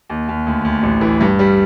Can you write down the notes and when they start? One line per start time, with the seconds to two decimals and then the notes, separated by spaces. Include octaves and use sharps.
0.09 D#2
0.29 D#2
0.47 D2
0.65 D2
0.83 A1
1.01 E3
1.21 G2
1.39 G3